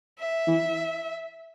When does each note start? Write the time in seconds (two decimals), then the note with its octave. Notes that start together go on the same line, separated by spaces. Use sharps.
0.19 E5
0.47 E3